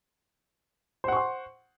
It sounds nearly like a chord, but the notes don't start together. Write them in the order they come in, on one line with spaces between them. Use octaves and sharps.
C5 F#5 C#6 C6